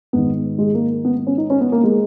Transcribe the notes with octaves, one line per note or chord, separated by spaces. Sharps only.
G#2 D#3 B3
G#3
A#3
B3
C#4
D#4
C#4
B3
A#3
G#3